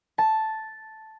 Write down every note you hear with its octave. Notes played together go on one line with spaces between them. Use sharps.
A5